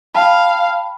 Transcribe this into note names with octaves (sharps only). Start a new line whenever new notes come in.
F5 G5 A5 B5